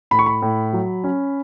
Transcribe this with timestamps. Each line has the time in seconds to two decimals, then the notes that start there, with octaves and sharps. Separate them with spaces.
0.11 A2 B5
0.19 C#6
0.26 B5
0.42 A2
0.73 F#3
1.04 C#4